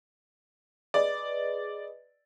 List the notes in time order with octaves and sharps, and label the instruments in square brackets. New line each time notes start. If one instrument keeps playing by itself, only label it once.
[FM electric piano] G#4 B4 D#5 [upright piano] D5